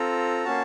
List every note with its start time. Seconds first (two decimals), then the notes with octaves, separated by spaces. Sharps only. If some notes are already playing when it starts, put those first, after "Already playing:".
Already playing: C4 F4 A4 A#5
0.45 A#3 C#4 F#4 A5